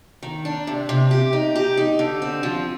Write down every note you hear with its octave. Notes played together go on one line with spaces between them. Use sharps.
D#3
D4
C3
C3
G4
D#4
G4
D#4
D3
C4
F3